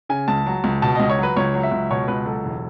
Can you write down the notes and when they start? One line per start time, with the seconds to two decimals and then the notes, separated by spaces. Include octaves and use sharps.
0.09 C#3 G#5
0.28 C#2 A5
0.46 F#3
0.64 C#2
0.82 B2 A5
0.95 C#2 D#5
1.09 C#5
1.19 F#3 B4
1.37 C#2 C#5
1.54 F#3
1.63 E5
1.72 C#2
1.91 B2 C#5
2.08 C#2 B4
2.26 F#3 A4
2.44 E1